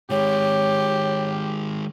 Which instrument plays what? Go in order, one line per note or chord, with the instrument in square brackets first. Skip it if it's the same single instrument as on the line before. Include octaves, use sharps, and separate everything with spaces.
[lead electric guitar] D#3 G#3 [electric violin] G4 [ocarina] C#5